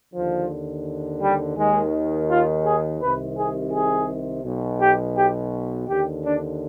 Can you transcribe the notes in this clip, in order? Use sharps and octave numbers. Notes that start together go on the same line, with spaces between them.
D#2 D3 F3
G3
D#2 D#3 G#3
F4
G#4
C2 C3 D#3 B4
G#4
G#4
B1 B2
G4
G4
D#2 D3 G4
D4